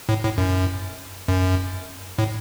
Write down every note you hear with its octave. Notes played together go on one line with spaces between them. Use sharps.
A2
A2
F#2
F#2
A2